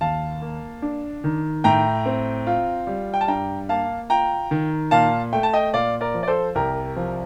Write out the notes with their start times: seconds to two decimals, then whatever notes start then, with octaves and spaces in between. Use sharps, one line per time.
0.01 D#2 F5 A5
0.42 A#3
0.82 D4
1.24 D#3
1.64 A2 G5 A#5
2.06 C4
2.47 F4
2.87 G3
3.14 G5
3.21 A5
3.28 G2 G5 A#5
3.69 A#3 F5 A5
4.10 F4 G5 A#5
4.51 D#3
4.91 A#2 F5 A5
5.33 A3 G5
5.43 A5
5.54 D#5 G5
5.73 A#2 D5 F5
6.01 A#4 D5
6.14 F3
6.23 D5
6.28 A4 C5
6.55 C2 G4 A#4
6.96 F3